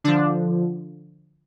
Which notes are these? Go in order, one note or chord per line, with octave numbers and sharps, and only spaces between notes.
D3 F3 D4